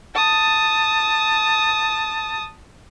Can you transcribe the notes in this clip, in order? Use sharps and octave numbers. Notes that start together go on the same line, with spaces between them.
A5 D#6